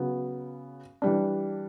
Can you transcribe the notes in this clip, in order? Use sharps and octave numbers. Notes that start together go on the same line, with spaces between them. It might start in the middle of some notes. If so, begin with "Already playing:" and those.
Already playing: C#3 F#3 B3
E3 G3 D4